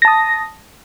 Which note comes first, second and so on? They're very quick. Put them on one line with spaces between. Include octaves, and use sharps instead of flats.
A#6 A5 D#6